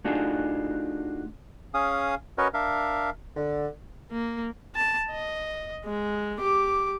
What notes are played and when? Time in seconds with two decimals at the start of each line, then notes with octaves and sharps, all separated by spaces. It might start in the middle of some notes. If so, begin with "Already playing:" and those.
0.05 A3 D4 D#4 F4 F#4 G#4
1.74 C#4 G#4 F5 D#6
2.38 C#4 F#4 A#4 B4 C#5 D#5
2.54 D4 A#4 E5 F5
3.36 D3
4.12 A#3
4.75 A5
5.10 D#5
5.85 G#3
6.39 G4 D6